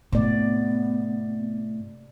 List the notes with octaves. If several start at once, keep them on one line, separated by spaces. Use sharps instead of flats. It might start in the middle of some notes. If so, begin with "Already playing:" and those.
A2 C3 B3 D5